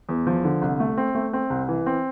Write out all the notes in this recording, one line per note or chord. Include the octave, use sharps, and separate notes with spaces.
E2
F3
D3
C2
A3
C4
A3
C4
C2
E3
C4